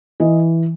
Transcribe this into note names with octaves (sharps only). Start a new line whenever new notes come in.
E3 D#5